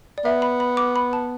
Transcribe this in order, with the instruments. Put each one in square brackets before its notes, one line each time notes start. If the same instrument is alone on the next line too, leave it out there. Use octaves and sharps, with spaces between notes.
[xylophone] D5
[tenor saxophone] B3 [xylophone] E5
[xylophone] B5
B5
D6
B5
A5